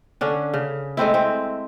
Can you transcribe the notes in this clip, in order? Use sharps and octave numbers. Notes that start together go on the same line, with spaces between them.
D3 C#4 D4
C#3
G#3 A3 C4 E4
C4